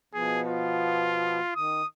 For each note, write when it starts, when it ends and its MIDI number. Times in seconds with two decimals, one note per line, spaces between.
0.14 1.40 47
0.14 1.40 53
0.14 1.40 59
0.14 0.41 68
0.46 1.51 65
1.56 1.82 51
1.56 1.87 87